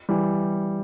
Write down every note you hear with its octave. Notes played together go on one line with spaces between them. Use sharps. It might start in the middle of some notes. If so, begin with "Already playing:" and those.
E3 G3